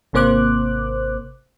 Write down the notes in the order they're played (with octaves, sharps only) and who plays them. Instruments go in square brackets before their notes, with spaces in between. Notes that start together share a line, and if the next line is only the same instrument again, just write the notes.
[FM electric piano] G#1 C3 A#3 C5 D6 F#6